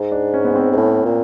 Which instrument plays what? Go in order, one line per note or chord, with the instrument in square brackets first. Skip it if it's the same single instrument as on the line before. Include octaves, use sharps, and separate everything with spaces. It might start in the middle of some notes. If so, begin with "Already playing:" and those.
Already playing: [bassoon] G#2
[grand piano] D4
C#4
B3
C4
[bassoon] G#2
[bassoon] A2 [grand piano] C#4
[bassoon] A#2